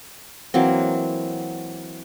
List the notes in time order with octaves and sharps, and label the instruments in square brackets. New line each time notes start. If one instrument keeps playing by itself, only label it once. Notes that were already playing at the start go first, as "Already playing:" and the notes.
[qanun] E3 F#3 A#3 C4